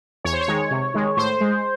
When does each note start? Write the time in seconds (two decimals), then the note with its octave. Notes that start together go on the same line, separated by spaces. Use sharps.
0.24 E2 C#5
0.33 C5
0.41 C#5
0.48 D#3 G#3
0.71 C3
0.94 D#3 G#3
1.17 A2 C5
1.41 G#3